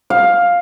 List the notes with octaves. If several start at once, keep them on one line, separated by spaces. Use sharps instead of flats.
F5